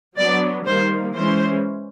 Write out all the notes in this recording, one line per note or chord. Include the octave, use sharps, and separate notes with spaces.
F#3 B3 D4 D5
D#3 G3 A#3 C5
E3 G#3 C#4 C5